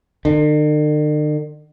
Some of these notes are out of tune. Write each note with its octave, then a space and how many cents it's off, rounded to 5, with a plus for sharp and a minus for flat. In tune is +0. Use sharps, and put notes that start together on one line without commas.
D3 +45